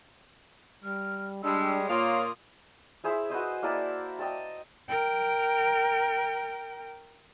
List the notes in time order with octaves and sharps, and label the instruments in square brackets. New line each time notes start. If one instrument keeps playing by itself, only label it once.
[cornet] G3 [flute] F6
[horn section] G3 G#3 [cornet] D4 [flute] E6
[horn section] A#2 A#3 F4 [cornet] C#5 [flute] D#6
[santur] E4 G#4 C5 E5
F#4 B4 C5 D#5
A#3 E4 D5 A5
D#5 G5 A5 A#5
[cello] A#4 G5